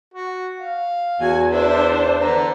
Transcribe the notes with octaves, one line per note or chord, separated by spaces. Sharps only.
F#4
F5
E2 F#4 G#5
D4 E4 B4 C5
D3 B4 A#5